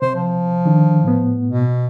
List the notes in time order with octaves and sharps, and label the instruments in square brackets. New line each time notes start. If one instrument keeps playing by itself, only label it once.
[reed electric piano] C3 [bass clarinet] C5
[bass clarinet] F3
[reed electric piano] D#3 D4
A2 B3
[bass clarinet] B2